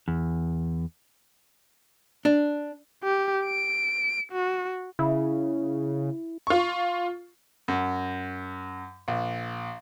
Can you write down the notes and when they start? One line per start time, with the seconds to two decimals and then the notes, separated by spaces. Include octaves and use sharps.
0.08 E2
2.25 D4
3.03 G4
3.44 D7
4.32 F#4
4.99 C#3 E4
6.47 F4 C#6
7.68 F#2
9.08 A#1